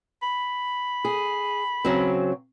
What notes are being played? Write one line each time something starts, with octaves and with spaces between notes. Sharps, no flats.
B5
G#4
C#3 F#3 C4